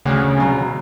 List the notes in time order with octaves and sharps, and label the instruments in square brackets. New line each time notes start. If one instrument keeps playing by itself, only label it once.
[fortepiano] D2 [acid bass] C#3
[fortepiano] B2 F#3